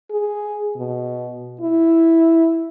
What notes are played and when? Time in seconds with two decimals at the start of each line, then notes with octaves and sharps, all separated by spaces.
0.11 G#4
0.76 B2
1.61 E4